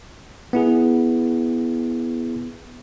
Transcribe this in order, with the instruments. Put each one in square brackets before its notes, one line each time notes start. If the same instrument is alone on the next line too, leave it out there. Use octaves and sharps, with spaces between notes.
[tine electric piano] B3 E4 G#4